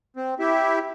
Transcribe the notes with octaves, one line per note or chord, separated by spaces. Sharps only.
C4
E4 G4 E5